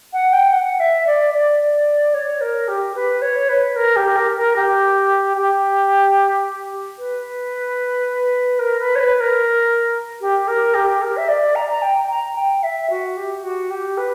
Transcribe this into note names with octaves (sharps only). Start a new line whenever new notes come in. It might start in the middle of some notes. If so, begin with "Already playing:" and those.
F#5
G5
F#5
E5
D5
D5
C#5
A#4
G4
B4
C#5
B4
A#4
G4
A#4
A#4
G4
G4
B4
A#4
B4
C#5
B4
A#4
G4
A#4
G4
A#4
E5
D5
A#5
A#5
G5
A#5
G5
E5
F#4
G4
F#4
G4
B4